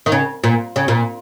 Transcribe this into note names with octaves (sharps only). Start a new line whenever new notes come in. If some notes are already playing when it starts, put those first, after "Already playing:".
D#3
C#3
A#2
C#3
A#2